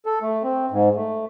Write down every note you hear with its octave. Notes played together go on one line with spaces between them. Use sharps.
A4
A3
C4
G#2
A3